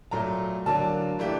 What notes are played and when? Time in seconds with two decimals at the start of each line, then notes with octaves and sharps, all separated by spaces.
0.11 A#2 F#3 A3 A#5
0.66 D3 F#3 A#3 D4 A5
1.19 E3 A3 D4 G4